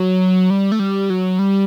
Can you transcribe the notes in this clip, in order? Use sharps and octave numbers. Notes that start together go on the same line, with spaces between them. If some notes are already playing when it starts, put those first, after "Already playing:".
Already playing: F#3
G3
A3
G3
F#3
G3